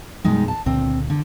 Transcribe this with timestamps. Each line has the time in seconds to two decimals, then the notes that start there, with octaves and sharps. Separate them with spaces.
0.24 F#2 B2 G3 G#3 D#4
0.48 A5
0.66 C#2 A#2 D3 C4
1.10 D3